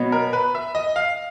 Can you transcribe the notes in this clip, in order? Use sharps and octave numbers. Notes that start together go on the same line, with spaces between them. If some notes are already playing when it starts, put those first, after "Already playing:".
Already playing: B2 F#3 B3
A#4
B4
E5
D#5
F5